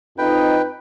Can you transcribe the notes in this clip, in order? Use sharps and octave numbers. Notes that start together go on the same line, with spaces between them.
F2 D#4 B4 G5